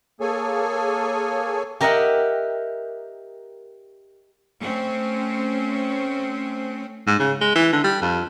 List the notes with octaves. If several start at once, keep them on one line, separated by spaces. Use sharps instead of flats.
A#3 G#4 A4 C#5 G#5
G4 A#4 D#5 E5 F#5 G5
A3 C4 C#4
G#2
C#3
G#3
E3
D3
G3
F2